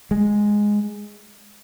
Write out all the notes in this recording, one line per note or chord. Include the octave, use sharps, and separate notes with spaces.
G#3